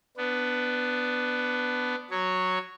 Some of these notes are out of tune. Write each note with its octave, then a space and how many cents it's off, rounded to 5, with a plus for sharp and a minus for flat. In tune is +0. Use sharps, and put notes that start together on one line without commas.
B3 +10 D4 +0
F#3 +0 C#5 +0